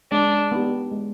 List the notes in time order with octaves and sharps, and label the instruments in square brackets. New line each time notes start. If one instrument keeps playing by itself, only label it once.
[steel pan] G#3 [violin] D4
[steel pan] B3 D#4 G4
G#3